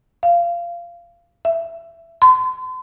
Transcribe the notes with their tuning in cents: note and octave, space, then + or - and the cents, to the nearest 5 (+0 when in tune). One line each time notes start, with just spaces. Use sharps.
F5 -20
E5 +20
C6 -40